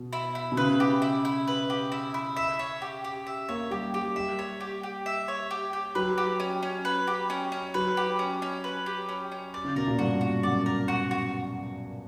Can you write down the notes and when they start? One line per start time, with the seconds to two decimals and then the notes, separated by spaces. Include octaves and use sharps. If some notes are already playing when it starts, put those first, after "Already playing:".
Already playing: B2
0.13 E4
0.35 E4
0.52 B2
0.57 C#3 B4
0.80 G4
1.02 E4
1.25 E4
1.48 B4
1.70 G4
1.92 E4
2.14 E4
2.36 E5
2.59 C#5
2.82 G4
3.04 G4
3.27 E5
3.49 A#3 C#5
3.71 G3 G4
3.94 G3 G4
4.15 G3 E5
4.39 C#5
4.61 G4
4.83 G4
5.06 E5
5.28 C#5
5.51 G4
5.73 G4
5.95 F#3 B4
6.18 G4
6.40 C#4
6.63 C#4
6.85 B4
7.07 G4
7.30 C#4
7.52 C#4
7.74 F#3 B4
7.97 G4
8.19 C#4
8.42 C#4
8.64 B4
8.86 G4
9.09 C#4
9.32 C#4
9.54 D5
9.64 C#3
9.76 B2 A#4
9.87 A#2
9.99 G2 F#4
10.21 F#4
10.43 F#2 D5
10.66 A#4
10.88 F#4
11.11 F#4